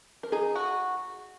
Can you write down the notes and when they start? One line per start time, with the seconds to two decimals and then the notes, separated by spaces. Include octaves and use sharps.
0.23 A#4
0.32 D#4 G#4
0.55 F#4